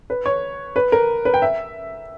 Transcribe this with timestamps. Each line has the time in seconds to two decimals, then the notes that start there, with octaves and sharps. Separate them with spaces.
0.10 B4
0.26 C#5
0.76 B4
0.92 A#4
1.25 B4
1.34 G5
1.42 E5